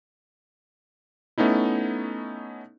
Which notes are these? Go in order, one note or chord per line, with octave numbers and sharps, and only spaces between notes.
A3 B3 C#4 D#4 E4